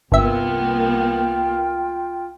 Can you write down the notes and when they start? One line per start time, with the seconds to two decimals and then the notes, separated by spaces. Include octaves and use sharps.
0.12 G1 C2 A#3 B3 F4 E5 G5